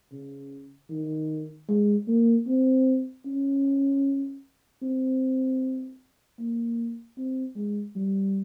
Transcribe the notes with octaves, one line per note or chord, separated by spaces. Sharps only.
C#3
D#3
G#3
A#3
C4
C#4
C4
A#3
C4
G#3
G3